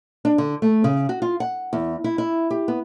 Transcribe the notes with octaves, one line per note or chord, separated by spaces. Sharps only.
D4
D3
A3
C#3
F#4
F4
F#5
E2
E4
E4
G4
B3